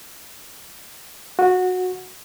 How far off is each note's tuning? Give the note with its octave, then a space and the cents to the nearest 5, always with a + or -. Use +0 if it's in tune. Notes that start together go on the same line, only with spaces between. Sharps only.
F#4 -15